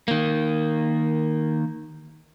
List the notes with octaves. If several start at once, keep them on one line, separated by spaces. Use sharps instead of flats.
D#3 A#3